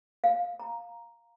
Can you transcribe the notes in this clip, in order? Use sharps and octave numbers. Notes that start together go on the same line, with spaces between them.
F5
A#5